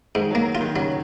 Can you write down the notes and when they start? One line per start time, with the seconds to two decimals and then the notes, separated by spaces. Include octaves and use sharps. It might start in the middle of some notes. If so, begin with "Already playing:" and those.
0.15 G#2 D#3
0.31 F#3 A#3
0.55 F4
0.61 D#3
0.75 C#3 F#3